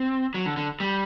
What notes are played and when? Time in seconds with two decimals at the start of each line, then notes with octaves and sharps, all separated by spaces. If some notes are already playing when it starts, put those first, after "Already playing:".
Already playing: C4
0.34 F#3
0.46 D3
0.57 D3
0.80 G3